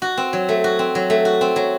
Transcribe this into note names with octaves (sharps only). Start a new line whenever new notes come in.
F#4
C4
F#3
A3
F#4
C4
F#3
A3
F#4
C4
F#3